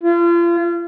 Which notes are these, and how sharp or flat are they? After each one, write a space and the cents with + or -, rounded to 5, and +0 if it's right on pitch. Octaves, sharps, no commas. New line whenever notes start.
F4 -35